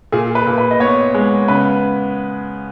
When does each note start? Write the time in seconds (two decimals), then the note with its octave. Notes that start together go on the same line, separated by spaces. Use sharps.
0.12 A#2 G#4
0.35 B4
0.46 A#2
0.58 B4
0.71 D#5
0.80 B3 C#5
1.14 G#3
1.48 C#3 B4